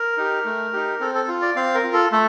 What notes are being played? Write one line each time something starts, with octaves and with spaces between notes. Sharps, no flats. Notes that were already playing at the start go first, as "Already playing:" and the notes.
Already playing: A#4
D#4 G4
A3
D#4 G4
C4 A4
A4
F4
D5
C4 F5
A#4
F4
A4
A3 A4